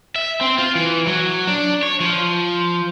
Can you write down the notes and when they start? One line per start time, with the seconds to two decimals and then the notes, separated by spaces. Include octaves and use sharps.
0.16 E5
0.41 C4
0.58 F4
0.75 E3
1.07 F#3
1.47 D4
1.83 C#5
2.00 F3